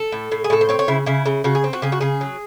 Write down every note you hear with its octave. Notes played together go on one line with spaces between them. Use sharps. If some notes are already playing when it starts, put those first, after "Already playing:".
Already playing: A4
A2
A2
G#4
A2 A4
C5
C4 C#5
C#5
C#3 E4
C#3 E4
C#3
C#3 F#4
G#4
C4
F#4
C#3 G#4
F#4
C#3 G#4
F#3